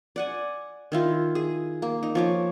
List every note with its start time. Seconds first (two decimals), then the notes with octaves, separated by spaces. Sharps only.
0.16 D5 F#5 G#5
0.92 D#3 E4 F4
1.35 G#4
1.82 A#3
2.03 D#4
2.15 F3 C#5 D6